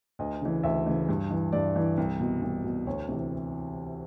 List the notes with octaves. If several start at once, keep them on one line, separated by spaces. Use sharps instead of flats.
D2 D#5
C#3 E3
D2 E5
C#3 E3
G2
E3
G2 D5
E3
C2
B2
C2
B2
D2 C#5
C3 E3